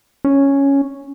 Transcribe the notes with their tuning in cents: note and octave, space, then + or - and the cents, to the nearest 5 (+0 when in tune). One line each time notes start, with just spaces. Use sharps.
C#4 +0